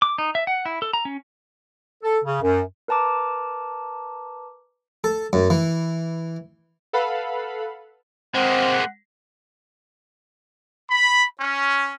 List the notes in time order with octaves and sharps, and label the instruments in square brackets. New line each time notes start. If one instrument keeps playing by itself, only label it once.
[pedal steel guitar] D6
D#4
E5
F#5
E4
A4
A#5
C#4
[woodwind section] A4
C#3
F#2
[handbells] A#4 B4 A5 A#5 D6
[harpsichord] A4
F#2
E3
[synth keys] A4 B4 F5 F#5 B5
[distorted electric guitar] G#3 A#3 [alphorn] C4 [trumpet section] F#5
[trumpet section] B5
C#4